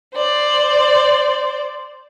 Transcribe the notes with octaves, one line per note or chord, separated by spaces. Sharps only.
C5 D5